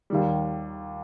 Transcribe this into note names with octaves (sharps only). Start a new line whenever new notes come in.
D#2 D#3 G3